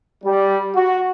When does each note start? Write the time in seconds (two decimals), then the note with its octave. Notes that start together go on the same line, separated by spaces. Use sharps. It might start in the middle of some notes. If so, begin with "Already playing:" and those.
0.24 G3
0.75 F#4